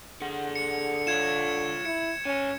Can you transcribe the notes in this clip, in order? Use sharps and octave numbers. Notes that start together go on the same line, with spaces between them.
D3 G#4 F#5
C#7
F4 C#5 G#6 E7
E4 C#7
G#2 C#4 G#5